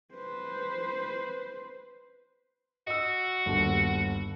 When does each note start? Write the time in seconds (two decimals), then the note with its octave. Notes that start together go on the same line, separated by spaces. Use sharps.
0.13 B4 C5
2.87 F#4 D#5 E6
3.46 G1 D#2